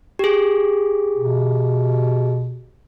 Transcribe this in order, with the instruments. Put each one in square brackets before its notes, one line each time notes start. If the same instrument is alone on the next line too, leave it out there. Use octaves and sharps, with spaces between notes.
[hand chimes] G4 G#4
[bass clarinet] B2